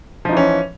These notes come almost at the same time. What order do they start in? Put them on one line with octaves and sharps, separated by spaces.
F3 D#4 E3 C#4